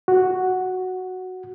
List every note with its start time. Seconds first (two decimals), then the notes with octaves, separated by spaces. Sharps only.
0.08 F#4